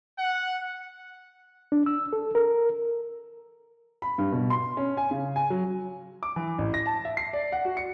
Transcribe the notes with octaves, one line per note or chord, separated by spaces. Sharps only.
F#5
D4
E6
A4
A#4
B5
G2
B2
C6
C#4
G#5
C#3
G#5
F#3
D6
E3
A1
A#6
A5
E5
C7
D5
F#5
F#4
C#7